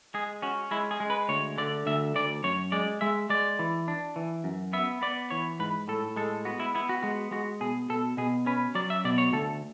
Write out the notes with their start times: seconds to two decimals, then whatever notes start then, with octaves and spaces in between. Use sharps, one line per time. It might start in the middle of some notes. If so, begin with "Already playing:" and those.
0.14 G#3 G#4
0.42 C#4 F#4
0.71 G#3 E4
0.91 G#4
1.00 G#3
1.10 B4
1.29 D2 C#5
1.58 D3 D5
1.86 D2 E5
2.15 D2 D5
2.44 F#2 C#5
2.72 G#3 D5
3.01 G#3 E5
3.30 G#3 D5
3.59 E3
3.88 D4
4.16 E3
4.44 F#2
4.73 B3 E5
5.02 B3 D5
5.30 E3 C#5
5.60 G#2 B4
5.88 A2 A4
6.16 G#3 A4
6.45 B3 F#4
6.60 E4
6.75 B3 E4
6.89 F#4
7.03 G#3 F#4
7.31 G#3 F#4
7.60 B2 G#4
7.90 B2 A4
8.17 B2 G#4
8.46 C#4 B4
8.75 F#3 D5
8.90 E5
9.04 B2 D5
9.18 C#5
9.33 D2 A4